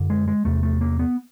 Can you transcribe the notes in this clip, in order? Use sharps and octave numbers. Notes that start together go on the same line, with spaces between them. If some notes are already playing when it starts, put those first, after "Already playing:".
Already playing: F#2 D3
G#3
G#3
E2 C3 A3
A3
A#3
B3